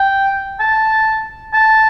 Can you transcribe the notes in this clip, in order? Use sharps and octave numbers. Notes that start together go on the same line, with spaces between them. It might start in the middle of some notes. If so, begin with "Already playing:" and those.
Already playing: G5
A5
A5